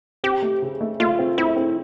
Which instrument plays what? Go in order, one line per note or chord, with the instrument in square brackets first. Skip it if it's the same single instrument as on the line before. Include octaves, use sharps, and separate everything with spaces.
[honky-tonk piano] C4 [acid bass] G4
[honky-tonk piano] A3
C#3
A3
[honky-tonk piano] A3 [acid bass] F4
[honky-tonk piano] C4
[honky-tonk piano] C4 [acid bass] E4
[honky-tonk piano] C4